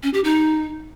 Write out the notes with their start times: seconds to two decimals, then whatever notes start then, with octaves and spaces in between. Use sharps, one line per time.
0.03 C#4
0.14 G4
0.24 D#4